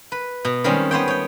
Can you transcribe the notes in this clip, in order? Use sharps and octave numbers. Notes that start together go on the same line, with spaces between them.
B4
B2
D#3 G3 G#3 C4 C#4
B3 C5 C#5 G5
C#5 G5